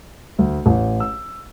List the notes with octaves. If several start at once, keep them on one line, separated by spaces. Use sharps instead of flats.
D2
A1
E6